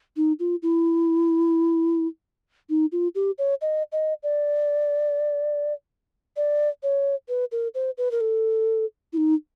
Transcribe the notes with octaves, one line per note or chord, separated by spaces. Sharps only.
D#4
F4
E4
D#4
F4
G4
C#5
D#5
D#5
D5
D5
C#5
B4
A#4
C5
B4
A#4
A4
E4
D#4